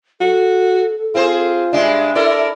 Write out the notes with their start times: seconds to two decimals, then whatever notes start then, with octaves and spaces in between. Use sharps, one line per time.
0.21 F#4 A4
1.15 C4 F4 G#4 C5
1.73 G2 G#3 D4 E5
2.15 E4 A4 A#4 D5